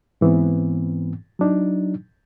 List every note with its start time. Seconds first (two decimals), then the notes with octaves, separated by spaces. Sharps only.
0.21 G#2 E3 B3 C4
1.39 F#3 D4 D#4